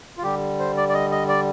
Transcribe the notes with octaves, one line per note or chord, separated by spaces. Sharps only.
F4
D3 G3 G4
C5
D5
D5
D#5
D#5
D5